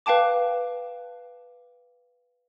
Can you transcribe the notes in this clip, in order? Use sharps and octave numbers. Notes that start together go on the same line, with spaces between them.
B4 F5 G5 A5 D6